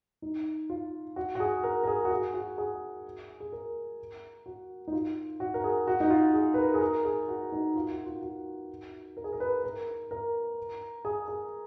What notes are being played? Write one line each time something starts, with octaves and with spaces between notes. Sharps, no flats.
D#4
F4
F#4
F#4
G#4
A#4
A#4
G#4
F#4
G#4
F#4
G#4
G#4
A#4
F#4
D#4
F4
F#4
A#4
G#4
F#4
D#4
F4
G#4
B4
A#4
G#4
A#4
G#4
F#4
D#4
F4
F#4
F4
F#4
A#4
G#4
A#4
B4
A#4
A#4
G#4
G#4